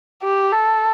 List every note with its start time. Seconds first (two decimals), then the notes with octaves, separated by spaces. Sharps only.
0.23 G4
0.52 A4